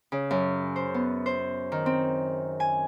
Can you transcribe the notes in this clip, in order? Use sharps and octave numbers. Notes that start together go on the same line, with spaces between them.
C#3
F#2
C5
B3
C5
D#3
C4
G#5